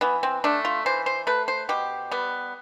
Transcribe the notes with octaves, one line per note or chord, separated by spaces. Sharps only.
E3 B3
C4
A3 D4
F4
E3 C5
C5
A3 B4
C5
B2 G4
G3 B3